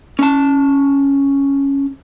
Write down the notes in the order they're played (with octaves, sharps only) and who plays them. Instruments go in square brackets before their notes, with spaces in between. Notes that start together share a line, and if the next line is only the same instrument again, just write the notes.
[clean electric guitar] C#4 A5